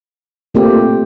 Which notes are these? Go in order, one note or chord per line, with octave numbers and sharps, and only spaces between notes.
A#2 A3 C4 G4